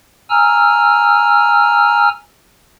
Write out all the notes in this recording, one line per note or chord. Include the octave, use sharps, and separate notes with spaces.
G#5 A#5 E6 F6